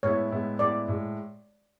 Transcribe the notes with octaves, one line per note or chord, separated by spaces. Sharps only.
A2 G#3 B3 E4 C#5
A2 G#3 B3 E4
A2 G#3 B3 E4 D5
A2 G#3